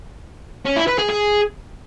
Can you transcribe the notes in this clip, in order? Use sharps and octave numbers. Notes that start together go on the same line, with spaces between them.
C#4
E4
B4
G#4
G#4